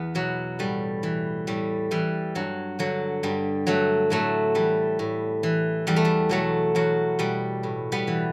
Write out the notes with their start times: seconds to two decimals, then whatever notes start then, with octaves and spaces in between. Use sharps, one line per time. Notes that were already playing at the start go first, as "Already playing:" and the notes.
Already playing: E2 B3
0.15 B2 F#3
0.59 A2 G3
1.03 E3
1.47 A2 G3
1.91 E3 G3
2.35 G2 F#3
2.79 D3 F#3
3.23 G2 G3
3.67 D3 F#3 A3
4.10 A2 F#3 A3
4.55 E3 G3
4.99 A2
5.43 E3
5.87 E2 G3
5.96 A3
6.05 G3
6.29 B2 F#3 A3
6.75 E2 F#3
7.19 B2 G3
7.63 A2
7.92 G3 B3
8.07 E3